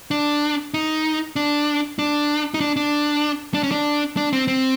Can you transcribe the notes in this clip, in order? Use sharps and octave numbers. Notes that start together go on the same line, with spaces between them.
D4
D#4
D4
D4
D#4
D4
D4
D4
C#4
D4
D4
C4
C4